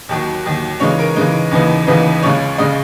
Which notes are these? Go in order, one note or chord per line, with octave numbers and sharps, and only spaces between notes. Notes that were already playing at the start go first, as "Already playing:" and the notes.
D#2 D#3 F#3
D#2 D#3 F#3
C#3 E3 G#3 D#4 C#5
A#4
C#3 E3 G#3 D#4
D#2 C#3 E3 B3 D#4
D#2 C#3 E3 B3 D#4 B4
C#2 C#3 G#3 C#5
C#3 G#3 D#5